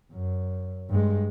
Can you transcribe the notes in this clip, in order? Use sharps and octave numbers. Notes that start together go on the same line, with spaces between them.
F#2
G2 G#3